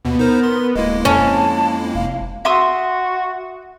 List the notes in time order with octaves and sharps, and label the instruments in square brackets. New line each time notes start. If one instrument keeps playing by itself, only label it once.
[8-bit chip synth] D#2 B2 [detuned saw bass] B3
[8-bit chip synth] D#4 C5 [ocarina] A#4
[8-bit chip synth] C6
[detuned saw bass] D1 [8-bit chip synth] G#3 A#3 E4 [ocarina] D#5
[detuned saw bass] F2 [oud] C#4 [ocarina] A5
[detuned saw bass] F1 [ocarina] F5
[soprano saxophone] F#4 [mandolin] E5 C6 D#6